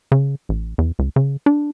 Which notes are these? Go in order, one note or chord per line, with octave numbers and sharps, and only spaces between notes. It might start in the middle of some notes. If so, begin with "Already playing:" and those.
C#3
A1
E2
C#2
C#3
D4